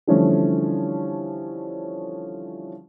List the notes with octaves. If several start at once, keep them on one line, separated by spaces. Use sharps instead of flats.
D3 E3 F3 G3 A3 C#4